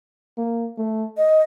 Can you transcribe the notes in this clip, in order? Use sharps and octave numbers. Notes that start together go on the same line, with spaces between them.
A#3
A3
D#5